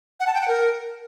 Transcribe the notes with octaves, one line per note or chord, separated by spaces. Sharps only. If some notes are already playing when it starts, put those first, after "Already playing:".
F#5
A5
G5
F#5
A#4